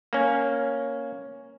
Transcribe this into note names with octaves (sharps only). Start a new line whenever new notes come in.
A#3 C#4